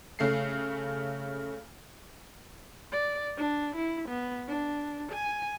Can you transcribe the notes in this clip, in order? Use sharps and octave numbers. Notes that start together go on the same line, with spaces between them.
C#3 A3 C7
D5
D4
E4
B3
D4
G#5